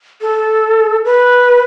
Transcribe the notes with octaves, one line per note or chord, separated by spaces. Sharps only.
A4
B4